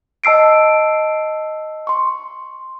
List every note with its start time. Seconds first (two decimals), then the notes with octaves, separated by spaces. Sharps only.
0.24 D#5 A5 E6 C7 D7
1.87 C6 C#6